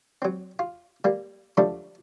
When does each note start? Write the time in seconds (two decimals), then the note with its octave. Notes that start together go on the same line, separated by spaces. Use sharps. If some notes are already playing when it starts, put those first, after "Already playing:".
0.22 F#3 C4
0.59 F4
1.04 G3 A#3
1.57 D3 F3 G3 A3 D4